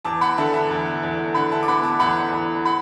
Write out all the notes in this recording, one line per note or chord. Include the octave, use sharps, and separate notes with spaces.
E2 A5 D6
F#5 B5
D3 E5 A5
E5 A5
E2
E2
D3 F#5 B5
E5 A5
D6
B3 F#5 B5
A5 D6
E2 F#5 B5
E2
F#5 B5